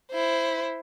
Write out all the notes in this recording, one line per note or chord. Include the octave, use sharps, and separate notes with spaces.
E4 C5